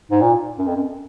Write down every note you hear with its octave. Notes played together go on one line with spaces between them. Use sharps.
G#2
A#2
F#2
F2
F#2